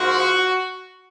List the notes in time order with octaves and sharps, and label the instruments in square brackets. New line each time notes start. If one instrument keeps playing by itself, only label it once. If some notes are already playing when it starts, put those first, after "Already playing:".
Already playing: [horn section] G#2 F3 A#3 F#4